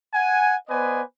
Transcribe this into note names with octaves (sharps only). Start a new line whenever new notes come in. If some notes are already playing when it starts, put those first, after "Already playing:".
F#5 G#5
B3 B4 C5 D5 D#5 G#5